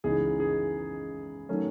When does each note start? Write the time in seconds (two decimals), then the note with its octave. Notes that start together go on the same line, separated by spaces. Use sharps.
0.04 C#2 C#3 E3 B3 D#4 G#4
0.40 G#4
1.49 D#3 F#3 A3 C#4